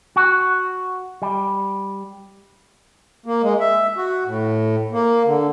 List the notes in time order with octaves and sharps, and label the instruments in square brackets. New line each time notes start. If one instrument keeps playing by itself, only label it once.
[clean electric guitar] F#4
G3
[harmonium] A#3
G#3
E5
F#4
A2
A#3
D3